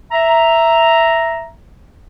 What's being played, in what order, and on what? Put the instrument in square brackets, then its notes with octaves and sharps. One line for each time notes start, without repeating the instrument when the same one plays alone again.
[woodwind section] E5 A#5